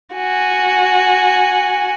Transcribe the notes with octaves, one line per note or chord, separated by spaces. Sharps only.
F#4 G#5